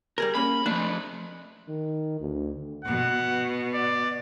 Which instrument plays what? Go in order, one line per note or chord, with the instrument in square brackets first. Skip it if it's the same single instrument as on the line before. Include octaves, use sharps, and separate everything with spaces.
[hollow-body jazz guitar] G3 G#4 A#4
[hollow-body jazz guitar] A#3 C#4 [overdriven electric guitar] B5
[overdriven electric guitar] F3 A3 [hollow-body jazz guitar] D4
[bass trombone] D#3
D2
[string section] B2 [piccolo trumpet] F#5
[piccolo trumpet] D5